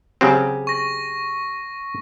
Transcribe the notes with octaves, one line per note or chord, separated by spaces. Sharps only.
C#3 F#3 C4 G4 G#4
C#6 A#6